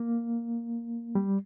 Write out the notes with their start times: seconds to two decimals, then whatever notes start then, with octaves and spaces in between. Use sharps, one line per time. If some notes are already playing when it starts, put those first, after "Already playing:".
Already playing: A#3
1.15 G3